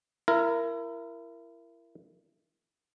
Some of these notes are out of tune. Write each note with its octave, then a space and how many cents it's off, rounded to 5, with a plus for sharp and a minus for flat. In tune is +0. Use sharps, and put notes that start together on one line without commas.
E4 +30 A#4 -5